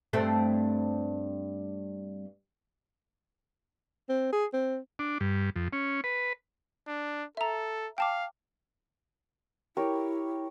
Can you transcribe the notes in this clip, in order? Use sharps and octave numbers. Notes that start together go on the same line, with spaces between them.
G2 A3 C4
C4
G#4
C4
D4
G2
F2
C#4
B4
D4
A4 E5 A#5
F5 G5 A5 D6
E4 G4 A#4 C#5